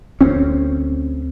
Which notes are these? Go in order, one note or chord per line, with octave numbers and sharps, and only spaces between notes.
D2 C4 C#4